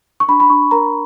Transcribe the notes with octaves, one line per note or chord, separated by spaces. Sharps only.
C#6
D4 B5
B5
D4 C#6
A#4 A#5